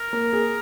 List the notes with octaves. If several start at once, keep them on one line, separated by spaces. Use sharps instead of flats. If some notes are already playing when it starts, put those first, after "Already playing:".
Already playing: A#4
A#3
G#4